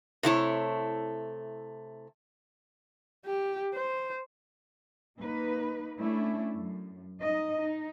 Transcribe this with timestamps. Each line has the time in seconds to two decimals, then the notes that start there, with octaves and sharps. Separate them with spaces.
0.23 C3 A3 E4 C#5
3.26 G4
3.75 C5
5.19 A#3 D#4 B4
5.99 A3 C#4 D4 E4
6.53 F#2
7.21 D#4 D#5
7.59 D#4